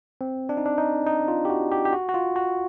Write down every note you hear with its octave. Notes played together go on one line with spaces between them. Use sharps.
C4
D4
D#4
D4
D#4
D#4
F4
G4
F#4
G4
G4
F#4
F#4
F4
F#4